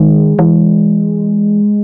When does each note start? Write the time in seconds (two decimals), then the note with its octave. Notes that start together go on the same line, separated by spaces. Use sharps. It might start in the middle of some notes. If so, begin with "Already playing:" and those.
Already playing: D#3 G#3
0.39 E3